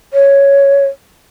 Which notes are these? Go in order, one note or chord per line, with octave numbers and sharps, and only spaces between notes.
C#5